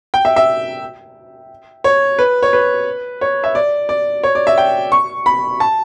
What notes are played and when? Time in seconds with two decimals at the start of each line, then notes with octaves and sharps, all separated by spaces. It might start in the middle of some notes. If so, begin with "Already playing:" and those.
0.14 G5
0.25 E5
0.36 E5
1.84 C#5
2.19 B4
2.43 C#5
2.53 B4
3.21 C#5
3.44 E5
3.55 D5
3.89 D5
4.23 C#5
4.35 D5
4.47 E5
4.58 G5
4.92 C#6
5.26 B5
5.60 A5